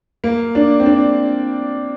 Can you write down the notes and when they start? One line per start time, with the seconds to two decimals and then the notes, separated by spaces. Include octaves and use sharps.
0.24 A#3
0.55 D4
0.80 C4
0.86 D4